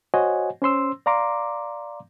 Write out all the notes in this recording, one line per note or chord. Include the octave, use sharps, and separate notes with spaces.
F#4 C5 C#5 D#5 F#5 G#5
C#4 C5 C6 E6
D5 F5 A#5 C6 D6